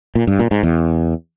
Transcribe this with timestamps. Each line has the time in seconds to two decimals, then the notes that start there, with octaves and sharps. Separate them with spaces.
0.15 A#2
0.27 G2
0.39 A#2
0.51 G#2
0.63 E2